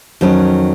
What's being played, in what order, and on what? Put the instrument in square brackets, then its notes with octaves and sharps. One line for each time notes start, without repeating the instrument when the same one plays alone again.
[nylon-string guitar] F2 D#3 F#3 C#4